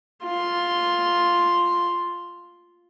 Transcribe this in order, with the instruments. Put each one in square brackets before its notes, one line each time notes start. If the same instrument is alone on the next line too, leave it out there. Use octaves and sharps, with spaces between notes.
[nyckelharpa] F4 C6